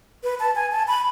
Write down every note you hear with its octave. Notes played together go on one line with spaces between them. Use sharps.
B4
A5
G#5
A5
B5